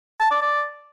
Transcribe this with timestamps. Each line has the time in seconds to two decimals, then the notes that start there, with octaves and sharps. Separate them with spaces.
0.20 A5
0.31 D5
0.42 D5